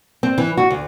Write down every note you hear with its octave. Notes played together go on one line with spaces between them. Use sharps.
C4
E3
F#4
D2